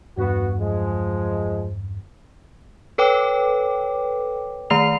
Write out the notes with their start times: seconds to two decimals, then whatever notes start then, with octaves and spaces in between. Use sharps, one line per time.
0.18 E2 G2 B3 F#4
0.60 F3 G#3
2.98 A4 B4 C#5 G5 D6
4.70 D#3 A3 A#5 C7 F7